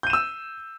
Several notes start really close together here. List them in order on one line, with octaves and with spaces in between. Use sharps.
G6 D#7 E7 E6